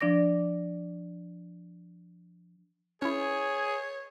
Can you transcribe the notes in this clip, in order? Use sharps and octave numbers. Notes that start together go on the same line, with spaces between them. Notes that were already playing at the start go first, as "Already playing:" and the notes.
F3 D4 D5 D6 A#6
C#4 E4 G#4 C#5